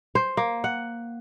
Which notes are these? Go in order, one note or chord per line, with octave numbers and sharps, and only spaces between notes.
C5
A#3
F#5